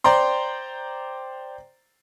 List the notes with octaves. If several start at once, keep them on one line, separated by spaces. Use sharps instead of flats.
C5 D5 G5 A#5 C6